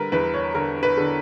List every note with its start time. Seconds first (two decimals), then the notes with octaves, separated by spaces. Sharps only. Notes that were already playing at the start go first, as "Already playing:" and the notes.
Already playing: D3 G3 A#4 B4
0.12 E2 B4
0.34 C#5
0.54 D3 A#4
0.83 B4
0.97 D3